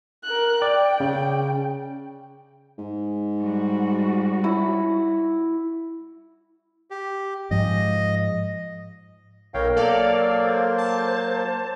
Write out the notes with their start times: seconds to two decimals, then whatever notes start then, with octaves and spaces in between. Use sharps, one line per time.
0.24 A#4 F#6
0.62 D5 G5
1.00 C#3
2.78 G#2
3.39 G3 F#4
4.44 E4
6.91 G4
7.51 G#2 F3 G#3 D#5
9.54 B1 A#4 C#5 F5 G5
9.76 F#3 A#3 A4 D5 F5
10.43 C5
10.78 A5